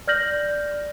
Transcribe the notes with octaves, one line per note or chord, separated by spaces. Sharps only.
D5 F6 G6 A#6 F#7